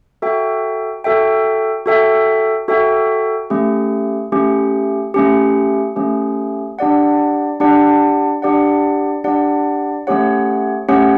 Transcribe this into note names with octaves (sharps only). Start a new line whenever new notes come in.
F#4 A4 E5 G5
F#4 A4 E5 G5
F#4 A4 E5 G5
F#4 A4 E5 G5
A3 C#4 G4
A3 C#4 G4
A3 C#4 G4
A3 C#4 G4
D4 G4 D5 F#5
D4 G4 D5 F#5
D4 G4 D5 F#5
D4 G4 D5 F#5
A3 C#4 G4 C#5 F#5
A3 C#4 G4 C#5 F#5